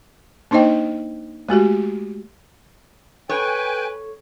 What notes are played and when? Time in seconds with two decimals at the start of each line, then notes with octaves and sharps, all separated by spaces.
0.51 A#3 D4 D#4 C5 D#5 G5
1.49 G#3 A3 F#4 G4
3.29 A4 B4 C#5 G5 G#5